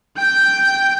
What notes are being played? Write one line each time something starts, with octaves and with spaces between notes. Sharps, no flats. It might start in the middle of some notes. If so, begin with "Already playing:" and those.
G5 G6